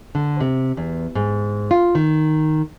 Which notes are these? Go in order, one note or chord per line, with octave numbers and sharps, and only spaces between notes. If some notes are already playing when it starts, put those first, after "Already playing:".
D3
C3
E2
G#2
F4
D#3